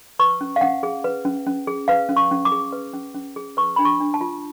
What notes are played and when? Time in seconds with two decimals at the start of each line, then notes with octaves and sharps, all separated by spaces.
0.19 B4 C#6
0.41 C#4
0.56 F5
0.61 C#4 F#5
0.83 G#4
1.04 B4
1.25 C#4
1.46 C#4
1.67 G#4
1.88 B4 F5
2.09 C#4
2.16 C#6
2.31 C#4
2.45 D6
2.52 G#4
2.72 B4
2.93 C#4
3.15 C#4
3.36 G#4
3.57 B4 C#6
3.76 D4 B5
3.85 C#6
4.00 D4
4.14 A5
4.21 F4